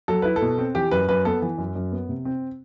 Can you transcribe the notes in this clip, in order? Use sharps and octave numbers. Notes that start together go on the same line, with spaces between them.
F#3 A4
E4 B4
A4
B2
C4
E3 G4
F#2 B4
F#2 B4
B3 A4
E3
F#2
F#2
B3
C3
C4